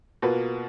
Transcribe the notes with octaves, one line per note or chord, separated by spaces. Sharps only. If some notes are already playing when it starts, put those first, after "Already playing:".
B2 A#3 F4 B4